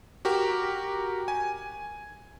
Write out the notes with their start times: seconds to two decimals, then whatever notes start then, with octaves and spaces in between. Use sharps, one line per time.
0.25 F#4 G4 A#4
1.28 G#5